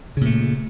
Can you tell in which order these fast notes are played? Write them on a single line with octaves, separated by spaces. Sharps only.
C#3 A#2 A3